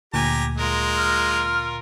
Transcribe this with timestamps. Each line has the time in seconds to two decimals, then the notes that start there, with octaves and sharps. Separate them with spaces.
0.14 D2 A#2 G4 G#5 A#5
0.58 G#3 F4 A#4
0.97 F6